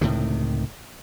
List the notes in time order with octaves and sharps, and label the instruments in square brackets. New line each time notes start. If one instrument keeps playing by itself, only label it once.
[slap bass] C#2 A2 C3 D#3